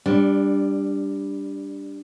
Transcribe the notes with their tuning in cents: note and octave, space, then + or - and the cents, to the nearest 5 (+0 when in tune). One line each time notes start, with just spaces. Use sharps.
G3 +10 D4 -10